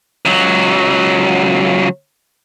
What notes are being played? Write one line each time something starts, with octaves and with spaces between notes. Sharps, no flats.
C#2 F#3